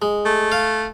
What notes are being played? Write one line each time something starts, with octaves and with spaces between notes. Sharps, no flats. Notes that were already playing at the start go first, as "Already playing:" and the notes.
G#3
A3
F5